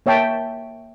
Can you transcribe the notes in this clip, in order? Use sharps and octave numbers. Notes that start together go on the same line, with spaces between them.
A#3 C#5 E5 G5 A5